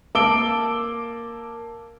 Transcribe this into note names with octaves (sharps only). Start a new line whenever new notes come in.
A#3 A5 D6 E6 D7 G7